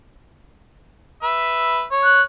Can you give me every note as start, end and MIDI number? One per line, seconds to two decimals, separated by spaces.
1.23 1.84 71
1.23 1.84 76
1.91 2.21 73
2.04 2.22 90